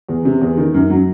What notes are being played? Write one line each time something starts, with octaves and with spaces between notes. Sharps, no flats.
E2
C3
E2
D#3
F#2
F#3